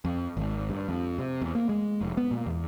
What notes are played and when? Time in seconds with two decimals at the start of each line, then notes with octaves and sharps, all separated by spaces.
0.05 F2
0.37 G#1
0.70 G2
0.89 F2
1.19 C3
1.42 E2
1.55 A#3
1.69 G#3
2.01 F1
2.17 B3
2.31 A#2
2.46 E2